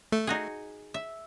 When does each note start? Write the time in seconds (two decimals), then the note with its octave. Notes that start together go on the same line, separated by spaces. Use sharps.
0.12 A3
0.27 D#4 F#4 G#4
0.94 E5